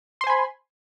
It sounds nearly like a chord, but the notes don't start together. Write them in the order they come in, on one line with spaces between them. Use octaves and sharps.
C6 C5 G#5 B5